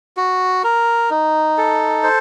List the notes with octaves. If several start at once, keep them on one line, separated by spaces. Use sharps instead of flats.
F#4
A#4
D#4
A4
C5